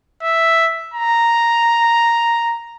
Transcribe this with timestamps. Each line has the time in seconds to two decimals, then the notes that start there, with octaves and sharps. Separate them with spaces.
0.23 E5
0.94 A#5